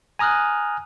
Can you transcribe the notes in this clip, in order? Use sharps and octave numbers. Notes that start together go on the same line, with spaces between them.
G#5 A#5 D#6 F6 F#6